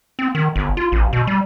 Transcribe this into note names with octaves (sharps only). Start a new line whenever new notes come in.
C4
D#3
G1
F4
A1
B2
G3